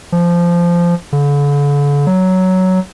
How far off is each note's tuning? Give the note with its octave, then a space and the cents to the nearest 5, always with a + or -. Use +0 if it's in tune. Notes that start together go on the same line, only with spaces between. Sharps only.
F3 -15
D3 -40
F#3 +10